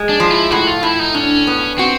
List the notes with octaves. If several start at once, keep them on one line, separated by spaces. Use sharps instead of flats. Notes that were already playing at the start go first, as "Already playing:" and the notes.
Already playing: G#3
D4
F3
E4
A2 F#4
F4
A2 E4
D#4
C#4 D4
B3
C4 F#4